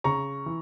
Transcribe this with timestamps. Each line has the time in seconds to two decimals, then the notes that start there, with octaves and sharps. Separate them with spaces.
0.04 C#3 A#5 C#6
0.46 E3